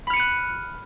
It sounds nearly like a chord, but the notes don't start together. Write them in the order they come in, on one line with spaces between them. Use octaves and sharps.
B5 F6 C#7 D#7 F#6